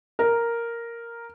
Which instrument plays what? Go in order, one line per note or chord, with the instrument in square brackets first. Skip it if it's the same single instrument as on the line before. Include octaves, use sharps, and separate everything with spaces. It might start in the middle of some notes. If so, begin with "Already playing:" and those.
[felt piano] A#4